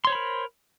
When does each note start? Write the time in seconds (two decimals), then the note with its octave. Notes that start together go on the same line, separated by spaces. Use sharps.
0.05 C6
0.07 C#5
0.10 C5
0.12 B5
0.15 A#4